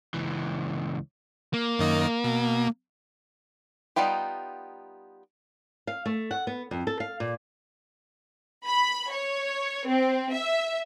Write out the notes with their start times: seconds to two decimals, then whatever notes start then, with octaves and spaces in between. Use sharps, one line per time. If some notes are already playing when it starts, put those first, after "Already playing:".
0.14 C#2 E3
1.54 A#3
1.79 F#2 D#3 D#5
2.24 B2
3.96 G3 B3 D#4 F4 G4
5.87 F5
6.06 A3
6.31 F#5
6.47 B3
6.71 F2
6.87 A4
7.00 F5
7.20 A#2
8.67 B5
9.11 C#5
9.87 C4
10.32 E5